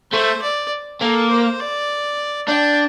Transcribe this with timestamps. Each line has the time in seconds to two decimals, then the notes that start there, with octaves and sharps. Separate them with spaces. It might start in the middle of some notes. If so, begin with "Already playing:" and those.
0.12 A3 C5
0.42 D5
1.01 A#3 A4
1.31 C5
1.61 D5
2.48 D4 G5